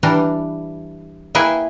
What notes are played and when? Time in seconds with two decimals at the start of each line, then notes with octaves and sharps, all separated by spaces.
0.03 E3 G3 D4 A#5
1.35 A#3 E4 G#4 B4 G5 G#5